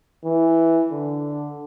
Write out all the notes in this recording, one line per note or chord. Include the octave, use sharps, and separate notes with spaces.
E3
D3